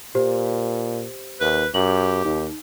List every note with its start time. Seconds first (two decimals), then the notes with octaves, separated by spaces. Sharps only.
0.15 A#2 G4 C5
1.41 D#2 B4
1.74 F#2 G4 F#7
2.25 D#2 D#4